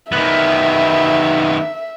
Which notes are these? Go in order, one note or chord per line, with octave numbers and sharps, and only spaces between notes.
D#3 B3 E5